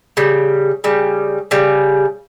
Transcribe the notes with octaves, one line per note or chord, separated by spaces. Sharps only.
C#3 G3
C#3 G3
C#3 G3